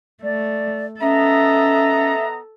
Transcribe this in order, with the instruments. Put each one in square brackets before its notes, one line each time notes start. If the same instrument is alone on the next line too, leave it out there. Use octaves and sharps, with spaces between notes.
[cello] A3 [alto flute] D5
[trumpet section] B3 D#5 A#5 [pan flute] C#4 [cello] A4 [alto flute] E5